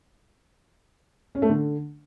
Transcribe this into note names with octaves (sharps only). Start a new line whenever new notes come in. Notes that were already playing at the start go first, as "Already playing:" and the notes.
C#4
A3
D3